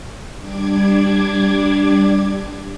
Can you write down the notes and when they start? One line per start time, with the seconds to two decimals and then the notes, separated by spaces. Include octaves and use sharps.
0.39 G3 D4 D6 G#6